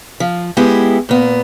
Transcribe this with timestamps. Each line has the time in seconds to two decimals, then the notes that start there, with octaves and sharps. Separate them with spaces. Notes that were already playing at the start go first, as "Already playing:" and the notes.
0.20 F3
0.57 G#3 B3 E4 G4
1.09 A#2 B3